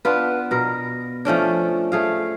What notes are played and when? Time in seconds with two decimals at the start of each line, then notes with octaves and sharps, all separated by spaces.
0.05 B3 D4 F4 B4
0.51 B2 A#4
1.25 F3 A3 C#4 D4
1.92 A3 G#4 F5